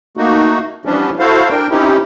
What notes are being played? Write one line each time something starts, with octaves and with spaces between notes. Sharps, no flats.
A3 A#3 D#4 F#4
E3 F3 G3 B3 C#4 D4
E4 F#4 A4 C5 F5
D4 A#4 G5
C4 C#4 D#4 E4 G4